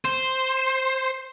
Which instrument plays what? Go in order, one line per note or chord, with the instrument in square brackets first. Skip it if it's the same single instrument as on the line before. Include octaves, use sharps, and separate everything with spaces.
[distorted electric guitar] C5